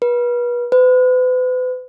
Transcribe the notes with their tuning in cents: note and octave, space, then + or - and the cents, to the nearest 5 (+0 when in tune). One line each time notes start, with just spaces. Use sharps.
B4 -35
B4 +40